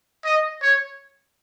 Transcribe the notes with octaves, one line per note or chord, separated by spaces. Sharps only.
D#5
C#5